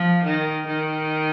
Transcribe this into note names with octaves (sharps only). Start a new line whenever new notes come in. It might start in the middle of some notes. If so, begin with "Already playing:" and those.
Already playing: F3
D#3
D#3